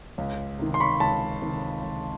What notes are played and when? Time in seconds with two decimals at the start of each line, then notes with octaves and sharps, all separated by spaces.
0.18 C#2
0.59 C3 D#3
0.74 C6
0.80 B5 C#6
1.00 C#2 A5 B5
1.42 C3 D#3
1.83 C#2